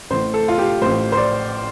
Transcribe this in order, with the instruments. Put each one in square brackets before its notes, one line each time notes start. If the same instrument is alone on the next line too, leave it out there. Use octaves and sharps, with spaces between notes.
[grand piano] A1 A2 C5
A4
F4
G4
A1 A2 C5
C5
D5